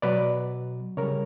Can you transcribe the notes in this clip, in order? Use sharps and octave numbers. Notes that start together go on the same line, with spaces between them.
B2 F#3 B4 D5
C#3 G3 A#4 C#5